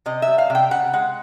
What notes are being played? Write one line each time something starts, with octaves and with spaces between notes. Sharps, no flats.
C3 D#5
E5
G3
F5
C3 G5
C#3 F#5
G#3 F#5